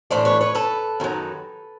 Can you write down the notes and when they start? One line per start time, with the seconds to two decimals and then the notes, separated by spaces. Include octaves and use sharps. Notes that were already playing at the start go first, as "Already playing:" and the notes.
0.11 A2 E3 A3 D4 C5 D5
0.25 B4 C#5
0.41 B4 C#5
0.55 A4 B4
1.00 F#2 D#3 F#3